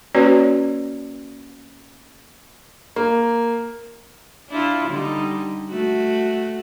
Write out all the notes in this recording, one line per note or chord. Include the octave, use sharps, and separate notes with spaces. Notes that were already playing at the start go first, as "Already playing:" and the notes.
A#3 C#4 F#4 B4 C#5 D5
A#3
D4 E4 F4
D3 G3 D#4
A3 F#4